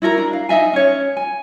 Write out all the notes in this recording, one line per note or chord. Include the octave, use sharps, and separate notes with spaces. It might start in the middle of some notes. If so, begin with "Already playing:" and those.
E4 F#4 A#4 A#5
D4
F5
D#4 D#5 E5 G#5
C#4 C#5
G#5